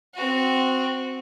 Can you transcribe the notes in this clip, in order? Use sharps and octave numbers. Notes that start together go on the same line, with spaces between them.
C4 F#4